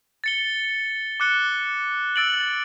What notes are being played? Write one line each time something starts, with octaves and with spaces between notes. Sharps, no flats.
A6 C#7 G7
D6 F#6 C#7 G7
E6 A6 D7 F#7